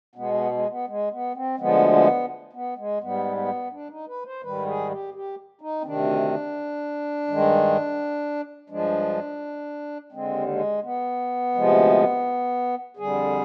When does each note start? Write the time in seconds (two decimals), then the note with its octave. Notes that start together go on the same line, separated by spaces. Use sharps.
0.15 B2 G#3 B3
0.34 B3
0.52 G#3
0.69 B3
0.87 G#3
1.11 B3
1.34 C4
1.58 D2 D3 F3 G#3 B3
1.94 B3
2.53 B3
2.77 G#3
3.00 G#2 G3 B3
3.36 B3
3.72 D4
3.89 D#4
4.07 B4
4.26 C5
4.43 G#2 D#3 G3 B4
4.66 G#4
4.90 G4
5.14 G4
5.61 D#4
5.81 C4
5.85 D2 C3 D#3 D4
7.28 G2 D#3 G#3
8.70 G2 F3 G#3 D4
10.12 D#2 D3 G#3 C4
10.48 G#3
10.83 B3
11.55 D2 C3 F3 G#3
12.97 F2 D3 G3 G#4